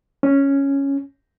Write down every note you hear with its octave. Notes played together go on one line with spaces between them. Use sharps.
C#4